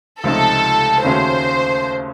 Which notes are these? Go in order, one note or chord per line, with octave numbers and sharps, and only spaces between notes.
C#2 C3 F3 A3 D#4 A4
D#2 C#3 A3 C#4 F#4 C5